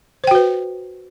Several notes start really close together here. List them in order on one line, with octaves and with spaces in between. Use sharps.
C5 G5 F#4 B4